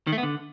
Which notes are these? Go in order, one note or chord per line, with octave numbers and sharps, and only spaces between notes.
D#3
A3
B3
D3